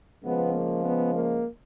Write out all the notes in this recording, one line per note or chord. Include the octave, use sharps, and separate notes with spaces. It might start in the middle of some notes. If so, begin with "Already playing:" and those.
C#3 F3 G#3 B3
A#3
B3
A#3